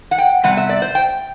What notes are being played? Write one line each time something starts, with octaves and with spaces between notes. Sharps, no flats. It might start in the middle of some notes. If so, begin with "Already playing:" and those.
F#5
G5
C3 G3 B3 F#5
E5
D5
C5
G5